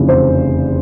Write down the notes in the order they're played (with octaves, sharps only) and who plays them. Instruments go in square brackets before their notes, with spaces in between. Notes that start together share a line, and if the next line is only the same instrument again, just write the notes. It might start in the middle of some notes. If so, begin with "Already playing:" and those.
Already playing: [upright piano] F1 E2 C#3 F3
C5